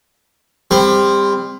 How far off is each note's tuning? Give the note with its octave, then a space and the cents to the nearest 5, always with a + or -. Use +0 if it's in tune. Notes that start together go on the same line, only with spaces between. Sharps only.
G3 +30 C4 +0